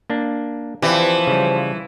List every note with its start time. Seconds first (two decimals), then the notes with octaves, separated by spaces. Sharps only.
0.10 A#3 D4
0.82 E3 F3 C4 G4 D5
1.27 C#3 G3